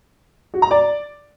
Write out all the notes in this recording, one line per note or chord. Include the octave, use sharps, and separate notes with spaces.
F#4
A#5
D5